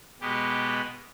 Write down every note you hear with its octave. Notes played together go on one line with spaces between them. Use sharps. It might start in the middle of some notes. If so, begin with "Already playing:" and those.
B2 G#3 B3 G4